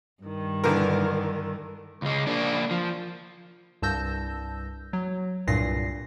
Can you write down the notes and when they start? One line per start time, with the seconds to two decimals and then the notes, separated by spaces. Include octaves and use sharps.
0.23 G2 D#3
0.64 D3 E3 A#4
2.02 C#2 G#3
2.27 A#3 D4
2.71 F3
3.82 C2 G2 A5 E6 G6 A#6
4.93 F#3
5.47 C2 G2 A#2 A#6 C7